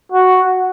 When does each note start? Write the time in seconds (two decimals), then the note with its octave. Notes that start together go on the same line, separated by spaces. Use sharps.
0.12 F#4